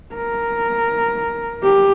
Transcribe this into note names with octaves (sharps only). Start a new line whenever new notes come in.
A#4
G4